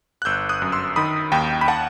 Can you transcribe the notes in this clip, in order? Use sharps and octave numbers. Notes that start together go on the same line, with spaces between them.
F#6
G1 E6 G6
D#6 F#6
F#2
C6 E6
D#3 B5 D#6
D#2 G5 B5
B5
F#5 A5